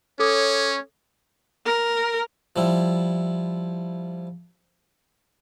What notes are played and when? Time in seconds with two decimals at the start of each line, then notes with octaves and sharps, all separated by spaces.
0.19 C#4 A4 C#5 D6 D#6
1.66 A#4
2.56 F3 G3 E4